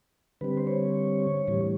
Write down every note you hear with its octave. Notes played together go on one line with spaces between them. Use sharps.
D3 G3 C4 B4
C5
C#5
A2 E3 G3